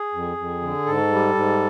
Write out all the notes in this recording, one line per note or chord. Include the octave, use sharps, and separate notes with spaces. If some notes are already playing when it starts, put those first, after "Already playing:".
Already playing: G#4
F2
F2
D3
G#2 A4
G3
G#2